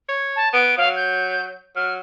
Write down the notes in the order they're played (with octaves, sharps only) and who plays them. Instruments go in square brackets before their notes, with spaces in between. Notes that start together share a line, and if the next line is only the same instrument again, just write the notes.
[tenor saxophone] C#5
[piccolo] A5
[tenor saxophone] B3 [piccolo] D7
[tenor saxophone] F#3 [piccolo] F5
[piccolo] G6
[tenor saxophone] F#3 [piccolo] F6